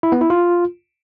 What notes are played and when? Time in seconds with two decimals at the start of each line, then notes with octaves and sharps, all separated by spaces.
0.03 E4
0.12 B3
0.21 E4
0.30 F4